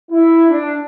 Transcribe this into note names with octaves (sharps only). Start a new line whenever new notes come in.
E4
D4